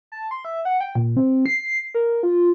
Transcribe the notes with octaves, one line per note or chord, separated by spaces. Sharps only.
A5
C6
E5
F#5
G5
A#2
C4
C7
A#4
F4